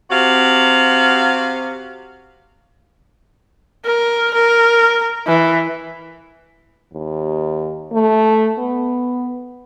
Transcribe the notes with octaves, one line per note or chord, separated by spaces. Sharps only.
C3 F#4 F5
A#4
A#4
E3
D#2
A3
B3